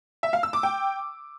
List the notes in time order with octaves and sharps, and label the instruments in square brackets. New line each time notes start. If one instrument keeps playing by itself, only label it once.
[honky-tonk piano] E5
F5
E6
D6
G5